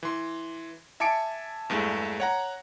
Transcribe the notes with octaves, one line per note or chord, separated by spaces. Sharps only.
E3 C6
E5 G#5 A5 D6 C#7 D7
E2 G2 G#3 A3
C#5 F#5 A#5